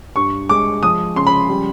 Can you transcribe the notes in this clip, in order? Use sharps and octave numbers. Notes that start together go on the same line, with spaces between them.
G2 C#6
G#3 D6
F3 D#6
C#3 C6
B5
G3